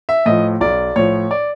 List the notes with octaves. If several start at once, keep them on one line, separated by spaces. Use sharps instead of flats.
E5
A2 F3 D#5
B1 D5
A2 F3 C#5
D5